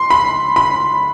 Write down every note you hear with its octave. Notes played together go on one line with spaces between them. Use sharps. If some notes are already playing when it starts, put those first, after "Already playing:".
Already playing: C6
B5
B5